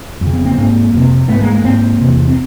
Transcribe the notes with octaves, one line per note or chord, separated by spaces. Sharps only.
F2
C#3
B3 C#4
A#3 C4
G#2 A#3 C4
F2 C3
G#2 A3 B3
G#3 A#3
G#3 A#3
G#2 A#3 C4
E2 C3
C4